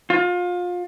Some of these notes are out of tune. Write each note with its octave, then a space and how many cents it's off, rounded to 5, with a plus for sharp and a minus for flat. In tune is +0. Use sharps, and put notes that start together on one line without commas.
F4 +30